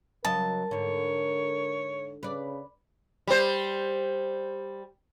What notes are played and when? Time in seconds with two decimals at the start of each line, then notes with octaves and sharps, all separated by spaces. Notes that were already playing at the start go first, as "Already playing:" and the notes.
0.25 C#3 F#3 A#4 D#5 A5
0.71 G#2 D3 C#5
2.23 C#3 B4 D5
3.27 G3 C5